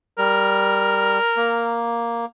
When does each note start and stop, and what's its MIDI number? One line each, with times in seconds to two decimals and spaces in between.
0.18 1.19 55
0.18 1.86 70
1.37 2.25 58